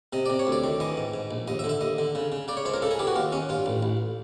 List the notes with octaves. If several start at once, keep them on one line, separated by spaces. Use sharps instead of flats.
C3 D#5
C3 D5
C#5
D2
D5
D#3
E3 D#5
G#2
G#2
A#1
D#2 D#5
E5
D3
E5
D#2 D#5
D3
C#3
C#3
C#3 D5
C#5
C#2 C5
A#4
C#3 A4
G#4
E3 G4
F#4
D#2 F4
D#2 C#4
G2 F4
A1
A1